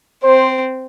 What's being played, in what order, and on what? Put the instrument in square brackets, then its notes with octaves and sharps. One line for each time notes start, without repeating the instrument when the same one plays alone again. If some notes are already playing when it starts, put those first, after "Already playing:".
[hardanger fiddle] C4 [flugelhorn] C5